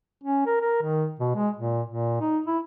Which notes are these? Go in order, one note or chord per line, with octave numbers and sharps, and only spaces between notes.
C#4
A#4
A#4
D#3
B2
G#3
A#2
A#2
D#4
E4